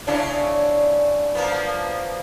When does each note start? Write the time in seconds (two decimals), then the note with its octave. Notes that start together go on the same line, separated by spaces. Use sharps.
0.07 C#3 D4 E4
1.35 F3 A#3 B3